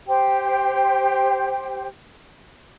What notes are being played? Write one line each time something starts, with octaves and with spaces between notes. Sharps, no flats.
G4 C5 G5